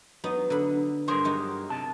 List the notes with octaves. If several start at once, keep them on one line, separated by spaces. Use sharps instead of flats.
F#3 B3 D#4
D3 B5
G2 F#3 G#4 A#4 C5 C6
F#3 D#4 G4
C3 A5